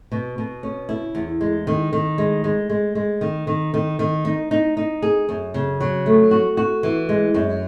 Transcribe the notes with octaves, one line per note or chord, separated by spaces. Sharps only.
B2
B2
C#4
E4
E2
G#3
D#3
D#3
G#3
G#3
G#3
G#3
D#3
D#3
D#3
D#3
D#4
D#4
D#4
G#4
F#2
C#3
F#3
A3
F#4
F#4
E3
G#3
F#2